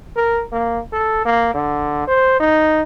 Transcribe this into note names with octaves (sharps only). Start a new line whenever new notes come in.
A#4
A#3
A4
A#3
D3
C5
D#4